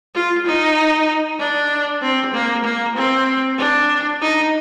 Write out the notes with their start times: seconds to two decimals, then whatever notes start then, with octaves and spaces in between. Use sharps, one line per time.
0.15 F4
0.46 D#4
1.39 D4
2.02 C4
2.34 A#3
2.64 A#3
2.96 C4
3.58 D4
4.21 D#4